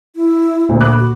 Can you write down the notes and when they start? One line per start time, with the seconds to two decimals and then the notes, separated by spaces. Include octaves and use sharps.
0.16 E4
0.69 D2 A#2
0.81 B5 D6 F#6
1.00 F#4